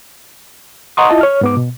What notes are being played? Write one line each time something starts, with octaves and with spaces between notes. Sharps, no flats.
D#5 F#5 A#5 C6 C#6 D#6
E4 F4 D#5 A5
C#5 F6
G#2 B3 D6
B2